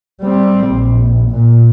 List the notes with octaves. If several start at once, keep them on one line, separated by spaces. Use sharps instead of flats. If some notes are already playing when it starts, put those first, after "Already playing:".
G3 C4
A#1
A#2